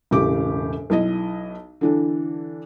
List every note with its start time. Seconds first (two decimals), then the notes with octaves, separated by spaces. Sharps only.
0.11 E1 A2 C#3 G4 D6
0.90 B1 E4 D#5
1.81 D3 E3 D4